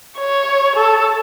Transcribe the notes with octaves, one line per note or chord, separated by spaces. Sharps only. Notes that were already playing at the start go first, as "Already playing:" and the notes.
C#5
A4